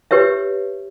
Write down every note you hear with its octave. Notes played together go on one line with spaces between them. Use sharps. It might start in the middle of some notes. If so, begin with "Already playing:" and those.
G4 B4 C#5 E5